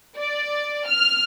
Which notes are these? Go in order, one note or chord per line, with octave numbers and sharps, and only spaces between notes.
D5
F6